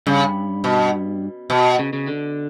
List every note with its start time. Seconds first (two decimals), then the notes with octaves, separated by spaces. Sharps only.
0.07 G2 C#3
0.64 B2
1.50 B2
1.79 C#3
1.93 C#3
2.07 D3